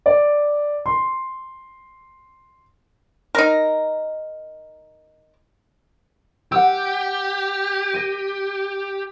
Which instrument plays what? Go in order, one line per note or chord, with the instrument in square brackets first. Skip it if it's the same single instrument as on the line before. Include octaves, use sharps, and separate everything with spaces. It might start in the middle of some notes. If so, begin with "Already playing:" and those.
[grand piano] D5
C6
[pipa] D#4 A#4
[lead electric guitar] G4 [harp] F#5 E6
[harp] A#6 D#7